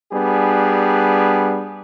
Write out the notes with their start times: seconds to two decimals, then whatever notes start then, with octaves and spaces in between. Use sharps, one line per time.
0.12 G3 B3 D4 G#4